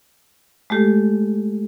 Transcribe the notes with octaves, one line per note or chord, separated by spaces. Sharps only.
G#3 A3 G4 A4